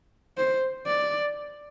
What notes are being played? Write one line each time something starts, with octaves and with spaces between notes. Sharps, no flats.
C5
D5